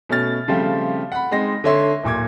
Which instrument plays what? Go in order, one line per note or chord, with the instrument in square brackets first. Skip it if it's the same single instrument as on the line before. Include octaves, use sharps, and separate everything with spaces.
[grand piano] B2 A3 C#4 F6 A6
C#3 F3 G3 A3 C4
F#5 B5
G#3 C4 D#4 A#6
D3 A4 C#5 E5 C6
D1 A#2 D6 G#6